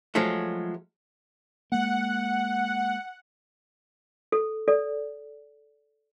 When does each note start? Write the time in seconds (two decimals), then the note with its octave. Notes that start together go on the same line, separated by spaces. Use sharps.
0.15 F3 F#3 G#3 A3
1.72 G#3 A#3 F#5
4.32 A4
4.68 A4 D5